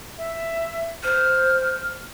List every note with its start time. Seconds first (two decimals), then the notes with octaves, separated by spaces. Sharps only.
0.18 E5
1.03 C5 F6